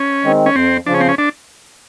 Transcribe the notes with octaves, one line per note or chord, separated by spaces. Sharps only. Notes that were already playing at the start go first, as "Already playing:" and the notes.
Already playing: C#4
D#3 G#3 C4
C#4
F2 C4
C#3 F3 D4
C#4
C4
C#4
D4